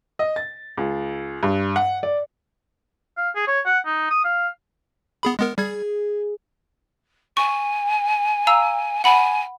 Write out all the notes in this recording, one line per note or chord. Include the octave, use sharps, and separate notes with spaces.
D#5
A6
C#2
G2
F#5
D5
F5
G#4
C#5
F#5
D#4
D#6
F5
B3 G#4 B5
G#3 B3 A#4
G3 G#4 G#6
G#5 C#6
F5 A#5 E6
F#5 G#5 B5